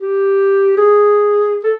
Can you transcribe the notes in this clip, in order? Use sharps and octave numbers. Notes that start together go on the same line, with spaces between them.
G4
G#4
A4